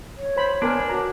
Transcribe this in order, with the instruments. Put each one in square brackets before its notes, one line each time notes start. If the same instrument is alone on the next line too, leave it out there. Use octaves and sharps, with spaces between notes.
[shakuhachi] C#5
[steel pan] C5 B5
[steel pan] B3 A#4 G#5 [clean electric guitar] D4
[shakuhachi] F#4 [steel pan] A#5